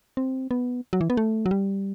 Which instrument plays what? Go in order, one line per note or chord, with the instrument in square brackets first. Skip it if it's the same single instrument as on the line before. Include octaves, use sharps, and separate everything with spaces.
[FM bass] C4
B3
F#3
E3
B3
A3
F#3
G3